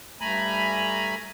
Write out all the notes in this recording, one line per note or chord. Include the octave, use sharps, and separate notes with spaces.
G2 A3 G#5 A#5 B5